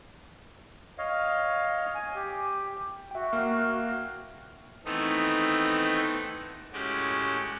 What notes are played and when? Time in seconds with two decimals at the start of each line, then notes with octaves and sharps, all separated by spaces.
0.98 C#5 D#5 F5
1.95 G#5
2.16 G4
3.11 F#4 E5 G5
3.33 A#3 F5
4.85 D#3 E3 A3 B3 C4 D#4
6.73 A2 G#3 C#4 F#4 G4